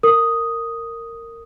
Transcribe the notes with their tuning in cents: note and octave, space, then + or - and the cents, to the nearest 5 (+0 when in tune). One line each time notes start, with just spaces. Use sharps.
A#4 -20 D#6 +0